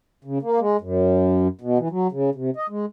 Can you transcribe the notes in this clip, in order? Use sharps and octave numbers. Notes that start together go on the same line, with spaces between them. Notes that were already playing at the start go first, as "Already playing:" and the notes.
C#3
A#3
G#3
F#2
B2
E3
F#3
C#3
C3
D#5
G#3